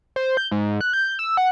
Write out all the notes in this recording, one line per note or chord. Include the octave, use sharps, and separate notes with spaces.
C5
G6
G#2
F#6
G6
E6
F#5